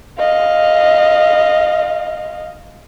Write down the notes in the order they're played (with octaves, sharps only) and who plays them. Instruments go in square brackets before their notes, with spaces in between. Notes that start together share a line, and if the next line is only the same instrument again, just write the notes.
[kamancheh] D#5 F5